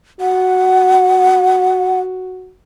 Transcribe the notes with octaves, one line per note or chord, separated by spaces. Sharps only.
F#4 F#5